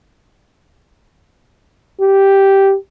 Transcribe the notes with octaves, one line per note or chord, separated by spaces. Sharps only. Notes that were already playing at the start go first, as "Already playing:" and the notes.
G4